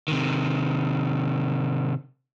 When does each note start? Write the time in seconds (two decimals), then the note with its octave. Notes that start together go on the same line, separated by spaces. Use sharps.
0.08 C3 D#3